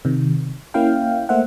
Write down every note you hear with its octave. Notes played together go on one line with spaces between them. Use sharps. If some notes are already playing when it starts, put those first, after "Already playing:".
C3 D#3
A#3 C#4 E4 F5 G5
A3 A#3 C5 E5 F#5